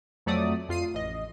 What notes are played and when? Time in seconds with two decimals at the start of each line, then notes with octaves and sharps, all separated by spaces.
0.26 F2 F#3 A3 D5 D#6
0.69 F2 F4 C7 D#7
0.94 A1 D#5